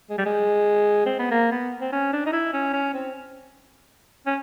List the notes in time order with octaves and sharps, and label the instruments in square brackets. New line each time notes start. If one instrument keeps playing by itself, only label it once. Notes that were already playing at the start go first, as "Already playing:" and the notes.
[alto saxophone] G#3
G3
G#3
C4
B3
A#3
B3
C4
C#4
D4
D#4
E4
C#4
C#4
C4
C#4